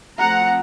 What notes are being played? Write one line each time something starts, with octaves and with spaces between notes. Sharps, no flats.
F3 A3 C4 F#5 A#5